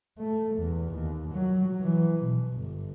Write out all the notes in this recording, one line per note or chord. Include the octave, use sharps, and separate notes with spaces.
A3
E2
D#2
F#3
E3
B2
G1